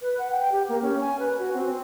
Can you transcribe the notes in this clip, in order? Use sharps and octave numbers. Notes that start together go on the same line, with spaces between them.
B4
F#5
G5
G4
A#3
C#4
G#5
B4
F#4
C4
C4